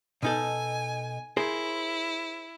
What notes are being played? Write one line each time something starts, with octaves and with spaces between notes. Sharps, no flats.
B2 D#4 A4 G#5
E4 G#4 A#4 C5